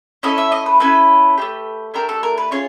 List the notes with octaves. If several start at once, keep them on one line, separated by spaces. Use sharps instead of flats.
C#4 E4 A4 D#5
E5
D#5
B4
C#4 E4 A4 B4
A3 D4 G4
A3 D4 G4 A#4
A4
A#4
B4
C#4 F4 G#4 C#5